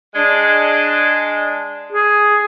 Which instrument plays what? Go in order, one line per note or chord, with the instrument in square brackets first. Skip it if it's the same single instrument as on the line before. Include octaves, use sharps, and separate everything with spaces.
[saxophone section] G#3 D4
[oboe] G#4